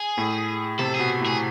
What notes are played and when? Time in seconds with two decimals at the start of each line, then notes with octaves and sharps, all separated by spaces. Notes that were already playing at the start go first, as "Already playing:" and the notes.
Already playing: G#4
0.17 A2
0.79 C3 A4
0.95 B2 G#4
1.21 A2
1.26 G#4